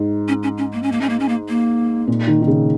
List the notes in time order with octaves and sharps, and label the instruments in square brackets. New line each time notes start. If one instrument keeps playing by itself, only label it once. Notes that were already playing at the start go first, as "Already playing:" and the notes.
Already playing: [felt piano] G#2
[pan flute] C#4
C#4
C#4
A#3
C#4
A#3
C#4
A#3
C#4
A#3
A#3
[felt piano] A#2
D#3
D#3
C#3